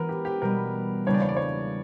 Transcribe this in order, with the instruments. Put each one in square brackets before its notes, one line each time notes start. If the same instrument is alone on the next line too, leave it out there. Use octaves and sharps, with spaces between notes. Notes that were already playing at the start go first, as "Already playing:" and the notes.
Already playing: [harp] E3 B3 F#4 [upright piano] A#4 B4
[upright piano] G4
G4
[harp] B2 G3 B3 [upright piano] A#4
[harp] E2 C#3 G3 A#3 D4 [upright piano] C#5
[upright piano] D5
C#5
D5
C#5